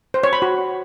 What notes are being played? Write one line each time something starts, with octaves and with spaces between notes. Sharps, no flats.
C5
C#5
B5
F#4